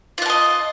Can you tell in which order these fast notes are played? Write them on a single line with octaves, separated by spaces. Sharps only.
F4 F#5 A5 D#5